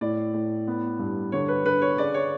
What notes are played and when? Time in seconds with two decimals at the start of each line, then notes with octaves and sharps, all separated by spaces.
0.01 A2 D5
0.34 A2
0.67 B3
0.99 G2
1.32 D3 C#5
1.48 B4
1.65 D3 B4
1.82 C#5
1.98 C#3 D5
2.14 C#5